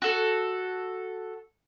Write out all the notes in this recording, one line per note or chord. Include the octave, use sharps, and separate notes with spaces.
F#4 A4